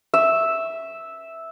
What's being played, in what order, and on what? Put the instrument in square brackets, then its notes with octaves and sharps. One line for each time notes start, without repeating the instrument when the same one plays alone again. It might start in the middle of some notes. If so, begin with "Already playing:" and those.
[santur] E5